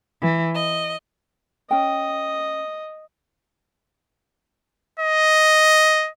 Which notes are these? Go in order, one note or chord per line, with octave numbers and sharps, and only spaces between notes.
E3
D#5
C#4 D#5 G5
D#5